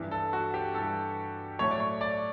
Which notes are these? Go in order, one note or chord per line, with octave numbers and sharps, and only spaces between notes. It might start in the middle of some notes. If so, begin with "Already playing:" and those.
Already playing: G2 E3 G3
A4
F#4
G4
G2 E3 G3 A4
A2 F#3 A3 C#5
D5
C#5
D5